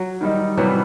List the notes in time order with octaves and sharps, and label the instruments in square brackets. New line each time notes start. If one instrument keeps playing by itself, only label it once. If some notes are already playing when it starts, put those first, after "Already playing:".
Already playing: [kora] F#3
[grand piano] D#3 G3 D#4
[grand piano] C3 E3 G3 B3 [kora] F#3